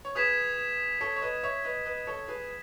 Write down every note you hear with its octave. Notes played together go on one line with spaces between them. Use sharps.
C#5
G#4 B4 D#6 G#6 B6 E7
A4 C#5
C#5
B4 D#5
C#5 E5
B4 D#5
B4 D#5
A4 C#5
G#4 B4